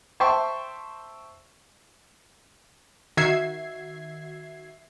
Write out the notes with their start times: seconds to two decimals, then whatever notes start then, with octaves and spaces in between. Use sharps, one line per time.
0.20 C5 E5 G5 A5 C6 C#6
3.17 D#3 F#4 E5 G#6 C7